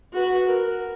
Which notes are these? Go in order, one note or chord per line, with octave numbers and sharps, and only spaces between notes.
F#4 B4
A#4